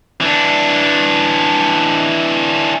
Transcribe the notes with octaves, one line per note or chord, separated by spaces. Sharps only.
E3 D4